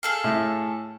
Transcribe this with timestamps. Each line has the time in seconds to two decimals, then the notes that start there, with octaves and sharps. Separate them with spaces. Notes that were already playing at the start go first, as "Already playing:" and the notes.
0.03 G#4 A4 F5
0.24 A2 E5